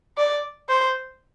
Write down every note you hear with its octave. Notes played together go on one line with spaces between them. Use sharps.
D5
C5